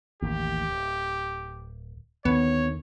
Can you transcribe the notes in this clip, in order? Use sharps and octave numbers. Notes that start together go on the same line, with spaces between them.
A1 D#2 G4
D1
D#2 D3 D#3 B3 C#5